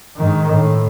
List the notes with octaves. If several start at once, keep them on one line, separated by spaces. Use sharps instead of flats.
G#2 D#3
A2